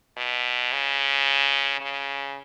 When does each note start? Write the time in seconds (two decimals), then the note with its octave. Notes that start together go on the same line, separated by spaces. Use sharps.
0.17 B2
0.72 C#3
1.81 C#3